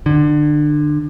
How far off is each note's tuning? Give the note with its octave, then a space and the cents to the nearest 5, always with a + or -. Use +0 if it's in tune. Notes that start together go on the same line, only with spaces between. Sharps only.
D3 +25